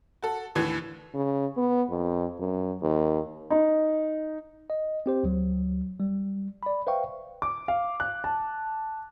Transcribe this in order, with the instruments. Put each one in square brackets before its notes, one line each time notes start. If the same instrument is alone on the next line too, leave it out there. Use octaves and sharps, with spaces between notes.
[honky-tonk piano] F#4 A4
D#2 A2 D3 E3 B4 G#6
[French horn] C#3
B3
F2
F#2
D#2
[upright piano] D#4
[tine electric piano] D#5
C4 G4 C5
D2 F#3
G3
D5 B5
B4 C5 E5 F5 G5 C#6
[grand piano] D6
F5
F#6
A5